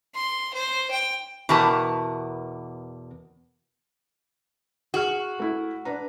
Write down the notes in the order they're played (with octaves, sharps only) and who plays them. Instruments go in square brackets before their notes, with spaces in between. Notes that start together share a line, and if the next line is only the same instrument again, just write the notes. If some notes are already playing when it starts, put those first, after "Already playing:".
[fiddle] C6
C5
G5
[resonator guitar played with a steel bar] E2 B2 G4 A#4 B4 A5
[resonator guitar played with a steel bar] F#4 [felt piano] G#4 F6
[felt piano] A3 E4
D4 B4 A#5